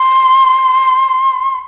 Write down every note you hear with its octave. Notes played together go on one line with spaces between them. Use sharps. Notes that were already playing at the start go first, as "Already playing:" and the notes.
Already playing: C6